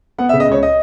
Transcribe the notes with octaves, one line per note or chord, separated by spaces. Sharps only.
B3 F#5
E5
C#3
D#5
C#2 C#5
D#5